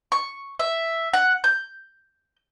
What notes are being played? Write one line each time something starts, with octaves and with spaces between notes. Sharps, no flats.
C#6
E5
F#5
G6